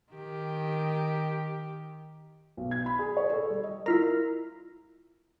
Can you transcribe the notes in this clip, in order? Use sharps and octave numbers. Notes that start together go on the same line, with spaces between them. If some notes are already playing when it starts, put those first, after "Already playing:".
D#3 G4
B1
G#6
B5
G#4
C#5
A4
G3
D#5
E4 F4 A#4